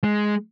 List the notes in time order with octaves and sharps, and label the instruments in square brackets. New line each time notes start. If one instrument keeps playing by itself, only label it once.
[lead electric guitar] G#3